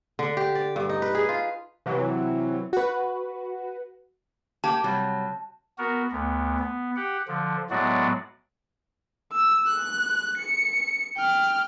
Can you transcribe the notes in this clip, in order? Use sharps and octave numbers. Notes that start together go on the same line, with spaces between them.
D3
G4
D5
G2
D#4
B4
G#4
F4
C3 E3 F#3
F#4 B4
A#3 G4 G5 A5
C3 F#3 G3
B3 F#4 A#4
D2 B3
B3
G4 F#5
D3 F3
A2 F#3 G#3 B3 F#4 D5
E6
F#6
C#7
G5 F6